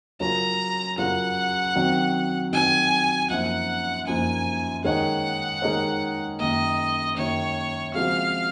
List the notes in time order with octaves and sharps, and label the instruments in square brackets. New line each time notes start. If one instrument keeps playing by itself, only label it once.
[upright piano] C#3 F#3 C#4 F4 A#4 [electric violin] A#5
[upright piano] C#3 F#3 C#4 F4 A#4 [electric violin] F#5
[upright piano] D#3 F#3 C4
[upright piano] D#3 F#3 C4 [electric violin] G#5
[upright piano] F#2 F3 A#3 D#4 [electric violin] F#5
[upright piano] F#2 F3 A#3 D#4 [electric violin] G#5
[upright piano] D#3 G#3 D#4 A#4 C#5 [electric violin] F#5
[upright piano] D#3 G#3 D#4 A#4 C#5
[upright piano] F#2 D#3 A#3 [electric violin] D#5
[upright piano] F#2 D#3 A#3 [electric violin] C#5
[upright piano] C#3 F3 G#3 C4 F#4 [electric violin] F5